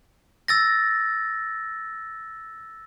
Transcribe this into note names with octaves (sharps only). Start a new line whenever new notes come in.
E6 A6 A#6